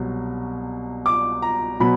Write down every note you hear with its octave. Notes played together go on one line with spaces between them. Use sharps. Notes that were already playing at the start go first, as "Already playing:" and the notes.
Already playing: C2 B2 F#3
D6
A#5
B2 F#3 B3 B5